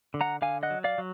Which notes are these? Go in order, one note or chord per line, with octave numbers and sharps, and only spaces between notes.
D3
F#5 A#5
D3 F5 G#5
D#5 F#5
F#3
D5 F5
F#3